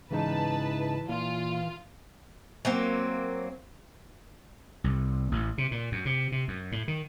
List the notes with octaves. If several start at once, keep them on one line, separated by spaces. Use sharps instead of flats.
G#2 C#3 E3 D#4 B4 A5
A#2 F4
F#3 A#3 C4
C2
A1
C3
A#2
F#2
C3
C3
F#2
A2
D#3